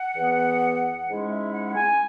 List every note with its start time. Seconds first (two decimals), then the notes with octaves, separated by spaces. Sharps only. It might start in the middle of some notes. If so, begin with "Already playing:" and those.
Already playing: F#5
0.15 E2 E3 B3
1.06 G#2 G#3 C#4 E4
1.29 E5
1.53 F#5
1.65 F#5
1.76 G#5